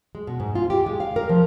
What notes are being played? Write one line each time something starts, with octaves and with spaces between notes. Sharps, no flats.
G#3
B2
G#2
F4
G4
G#3
F5
A#4
F3